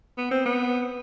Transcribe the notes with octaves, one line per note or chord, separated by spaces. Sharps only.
B3
C4
B3